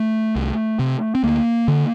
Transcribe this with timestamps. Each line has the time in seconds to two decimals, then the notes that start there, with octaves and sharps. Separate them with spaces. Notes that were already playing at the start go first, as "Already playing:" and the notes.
Already playing: A3
0.36 C2
0.79 C3
1.15 C4
1.23 D2 A#3
1.68 D3